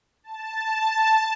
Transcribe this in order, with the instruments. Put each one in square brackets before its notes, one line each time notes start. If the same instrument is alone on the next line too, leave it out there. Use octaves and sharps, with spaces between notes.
[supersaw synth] A5